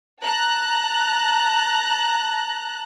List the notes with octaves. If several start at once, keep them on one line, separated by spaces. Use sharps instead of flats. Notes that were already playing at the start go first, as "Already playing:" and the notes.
A5 A#5 F#6